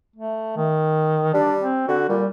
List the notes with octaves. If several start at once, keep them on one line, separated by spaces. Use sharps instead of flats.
A3
D#3
G3 D4
C4
D3 F#4
A#2 G3